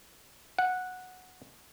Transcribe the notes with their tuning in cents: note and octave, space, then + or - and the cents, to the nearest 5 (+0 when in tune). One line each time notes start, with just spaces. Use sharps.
F#5 -10